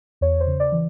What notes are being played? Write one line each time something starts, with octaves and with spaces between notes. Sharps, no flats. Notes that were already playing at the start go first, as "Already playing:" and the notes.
E2 C#5
C5
C#3
D5
E3